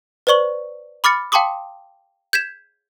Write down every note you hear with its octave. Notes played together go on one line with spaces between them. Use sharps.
B4 C5 D5 C#6 F#7
B5 D6 F6 A6 C#7
F5 G5 A5 C6 D6 D#6
G6 G#6 B6 E7